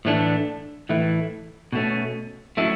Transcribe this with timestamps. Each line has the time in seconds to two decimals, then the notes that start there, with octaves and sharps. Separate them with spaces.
0.05 A2 E3 A3 D4
0.89 A2 E3 A3 E4
1.73 B2 A3 C#4
2.57 F#3 A3 C#4 E4